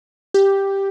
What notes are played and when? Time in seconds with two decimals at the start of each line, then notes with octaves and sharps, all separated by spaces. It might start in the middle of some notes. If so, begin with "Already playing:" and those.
0.34 G4